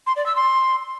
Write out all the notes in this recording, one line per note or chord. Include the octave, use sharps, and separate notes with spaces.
C6
D5
E6
C6